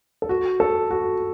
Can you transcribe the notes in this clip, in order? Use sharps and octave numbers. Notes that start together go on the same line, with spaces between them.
A4
F#4
A4
F#4